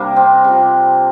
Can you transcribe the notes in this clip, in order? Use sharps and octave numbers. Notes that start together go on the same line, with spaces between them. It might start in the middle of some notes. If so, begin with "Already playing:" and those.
Already playing: C3 G3 A#3 D4
C4
C3 F3